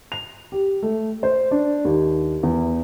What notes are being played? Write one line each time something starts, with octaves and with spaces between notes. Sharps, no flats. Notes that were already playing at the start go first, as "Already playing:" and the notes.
F7
G4
A3
C5
D4
D#2
E2